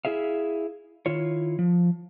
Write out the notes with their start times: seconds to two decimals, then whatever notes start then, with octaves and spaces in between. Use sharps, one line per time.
0.05 E4 G#4 E5 F5
1.06 D#3 E4 F4 C#5
1.59 F3